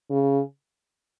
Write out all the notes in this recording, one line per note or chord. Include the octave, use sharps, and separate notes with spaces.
C#3